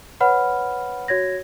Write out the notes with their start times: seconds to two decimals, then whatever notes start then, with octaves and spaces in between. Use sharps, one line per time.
0.20 B4 C#5 F#5 B5 F6
1.08 F#4 C#5 G#6 A#6